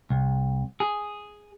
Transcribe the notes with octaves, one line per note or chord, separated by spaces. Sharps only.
C2
G#4